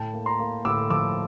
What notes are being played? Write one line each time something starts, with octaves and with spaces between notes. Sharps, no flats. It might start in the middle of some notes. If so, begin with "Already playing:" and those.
Already playing: A2 G5 A5
A#3
A#5 C6
A#3
A2 D6 E6
F3 D6 E6